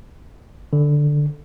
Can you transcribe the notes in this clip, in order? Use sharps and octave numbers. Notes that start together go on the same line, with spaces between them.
D3